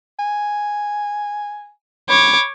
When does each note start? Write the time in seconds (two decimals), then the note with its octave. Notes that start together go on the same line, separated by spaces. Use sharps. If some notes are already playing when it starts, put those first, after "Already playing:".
0.19 G#5
2.10 C#5 B5 D6